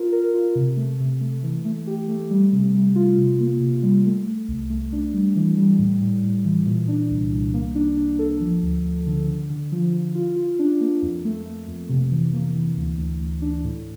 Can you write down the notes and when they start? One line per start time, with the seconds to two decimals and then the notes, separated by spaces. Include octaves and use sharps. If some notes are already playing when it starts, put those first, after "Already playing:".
Already playing: F4 A#4
0.12 A#4
0.34 F4
0.55 C3
0.77 A3
1.00 C3
1.21 A3
1.43 E3
1.65 A3
1.87 G4
2.08 A3
2.30 G3
2.53 C3
2.74 G3
2.96 F4
3.18 C3
3.40 A#3
3.61 C3
3.83 G3
4.05 A3
4.26 A3
4.48 C2
4.70 A3
4.92 D4
5.13 G3
5.36 E3
5.58 G3
5.79 A2
6.01 A2
6.23 A2
6.45 E3
6.66 A#2
6.88 D4
7.10 C2
7.32 C2
7.54 A#3
7.75 D4
7.97 D4
8.19 A4
8.40 F3
8.62 D2
8.85 D2
9.07 D3
9.28 D3
9.50 D3
9.72 F3
9.93 F3
10.15 F4
10.36 F4
10.59 D4
10.81 A#3
11.02 F2
11.24 A3
11.46 A3
11.67 F2
11.89 C3
12.12 E3
12.33 A#3
12.54 E3
12.77 D2
12.98 D2
13.20 D2
13.42 D4
13.64 A2